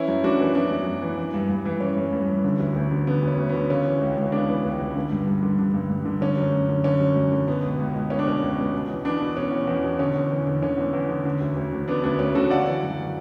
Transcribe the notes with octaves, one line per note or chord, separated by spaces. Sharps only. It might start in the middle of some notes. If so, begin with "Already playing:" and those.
Already playing: E3 C#4 E4
F#2
F#2 D4 F#4
E3
E3 B3 D4
F#2
F#2
E3
E3
G2
G2
E3
E3 C#4
G2
G2
E3
D3
D2
D2
D3
D3 B3
D2 C#4
D2
D3 B3
C#3 C#4
E3
C#2
C#2
C#3 B3 D4
E3
C#2
C#2
D3
G2
G2
D3
D3
G2
G2
D3
D3 C#4
F#2
F#2
D3
D3 C#4
F#2
F#2
D3
B2 B3
C#2
C#2
B2
B2 C#4
D4
C#2 C#4
C#2
B2
B2
E2
E2 B3 D4
B2
B2 C#4
E2
E2
B2
D3 C#4
E2
E2
D3
D3 C#4
E2
E2
D3
D3
D2
D2
D3
D3 B3 D4
D2 B3 D4
D2 C#4
D3 F#4 A4
C#3 D5 F#5
E3
F#2